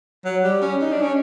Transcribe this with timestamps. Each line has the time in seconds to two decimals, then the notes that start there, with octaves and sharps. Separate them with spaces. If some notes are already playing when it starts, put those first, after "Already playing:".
0.25 F#3
0.44 G3
0.62 C#4
0.81 D#4
0.92 D4
1.02 C#4